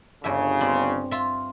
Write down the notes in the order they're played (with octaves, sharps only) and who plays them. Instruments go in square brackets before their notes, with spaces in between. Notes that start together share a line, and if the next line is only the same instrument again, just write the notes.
[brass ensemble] G1 C#3 [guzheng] G2 E5
[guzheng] C4 D5
F4 E5